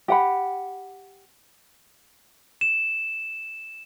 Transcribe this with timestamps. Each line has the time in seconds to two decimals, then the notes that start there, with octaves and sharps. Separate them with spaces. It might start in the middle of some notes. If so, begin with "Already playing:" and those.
0.08 G4 F#5 B5
2.61 E7